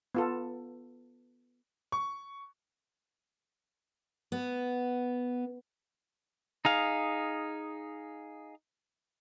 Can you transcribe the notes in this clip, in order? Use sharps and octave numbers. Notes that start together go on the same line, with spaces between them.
B3 F4 A4
C#6
B3
D#4 G#4 F5